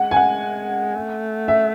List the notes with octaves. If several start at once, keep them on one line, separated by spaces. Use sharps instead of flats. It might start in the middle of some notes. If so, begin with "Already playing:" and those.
Already playing: G#3 F#5
G#5
F#5
A3
E5